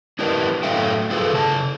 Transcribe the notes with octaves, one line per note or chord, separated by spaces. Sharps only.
D4 E4 G4 A#4 B4 D#5
A2 F#3 A4 E5 F5 G5
F4 G#4 A4 B4 F5
C#3 A5